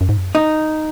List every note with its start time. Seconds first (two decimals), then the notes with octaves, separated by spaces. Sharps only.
0.01 F#2
0.09 G#2
0.17 F#2
0.35 D#4